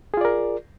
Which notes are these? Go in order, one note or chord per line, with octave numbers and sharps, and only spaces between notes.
F4 G#4 A#4 D5